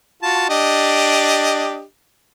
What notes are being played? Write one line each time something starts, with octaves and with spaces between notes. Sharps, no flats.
F4 F#4 A5
D4 G4 D#5